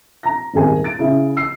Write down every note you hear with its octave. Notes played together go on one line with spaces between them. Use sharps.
A#5 A#6
D#1 G#1 D#3 G#4 G#5
A6 D7
C#3 E4
E6 C7